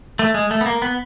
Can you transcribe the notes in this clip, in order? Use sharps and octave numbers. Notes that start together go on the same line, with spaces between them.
A3
G#3
A3
B3
A#3
B3